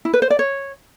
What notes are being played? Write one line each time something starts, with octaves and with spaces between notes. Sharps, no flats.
E4
B4
C5
D5
C#5